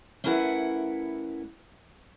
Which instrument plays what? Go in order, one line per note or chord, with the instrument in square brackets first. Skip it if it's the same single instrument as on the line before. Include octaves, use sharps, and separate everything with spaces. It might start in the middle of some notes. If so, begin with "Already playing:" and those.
[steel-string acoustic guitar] A3 C#4 E4 A#4 B4 F#5